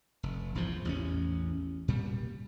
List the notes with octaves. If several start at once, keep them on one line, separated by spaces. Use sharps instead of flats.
F1
A#1 E2 G#2 F3
A1 E2 A3 C#4
A#2 G3